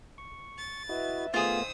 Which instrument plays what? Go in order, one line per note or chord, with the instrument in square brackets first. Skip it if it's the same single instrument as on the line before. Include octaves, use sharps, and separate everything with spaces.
[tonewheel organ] C#6
[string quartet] A6
[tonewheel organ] E4 F#4 D#5 [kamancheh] B4 E5
[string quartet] D#3 D#6 E6 [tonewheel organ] A3 B3 [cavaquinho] F4 G#4 [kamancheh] C5